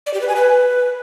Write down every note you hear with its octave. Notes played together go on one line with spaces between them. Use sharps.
D5
G4
B4
G#5
B4